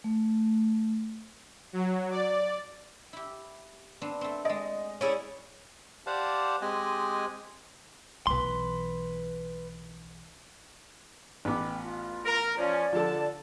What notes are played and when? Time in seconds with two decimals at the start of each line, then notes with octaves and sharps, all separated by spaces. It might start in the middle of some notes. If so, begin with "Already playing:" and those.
0.04 A3
1.73 F#3
2.11 D5
3.13 E4 G4
4.01 B3 C4 D4
4.21 A3 C4
4.45 G#3 D5 D#5
5.01 C#4 E4 G#4 D5
6.07 G4 C5 D5 F5 F#5 A5
6.62 G#3 C4 G4 D#5 G#5 F#6
8.27 B1 E3 B4 C6
11.45 A1 B3 G5 D6
11.82 F4
12.25 A#4
12.57 F3 C#4 D5
12.93 D3 F3 A4 A5